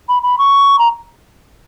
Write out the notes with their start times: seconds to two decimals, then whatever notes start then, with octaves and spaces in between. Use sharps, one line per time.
0.09 B5
0.23 B5
0.39 C#6
0.79 A#5